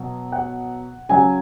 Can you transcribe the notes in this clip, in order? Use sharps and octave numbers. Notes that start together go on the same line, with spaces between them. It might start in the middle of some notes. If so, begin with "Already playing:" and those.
Already playing: B2 F#3
F#5
C#3 F#3 G#5